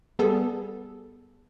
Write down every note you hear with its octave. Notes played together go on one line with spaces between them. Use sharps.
G3 B3 G#4 A4